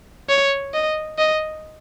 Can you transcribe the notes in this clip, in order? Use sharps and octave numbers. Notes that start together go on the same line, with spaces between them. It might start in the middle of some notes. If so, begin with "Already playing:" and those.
C#5
D#5
D#5